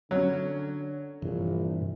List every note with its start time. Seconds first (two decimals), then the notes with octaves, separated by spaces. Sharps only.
0.11 D3 F#3 C#4
1.22 A#1 G2 C3 E3